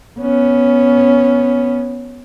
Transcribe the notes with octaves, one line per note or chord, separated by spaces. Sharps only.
B3 C#4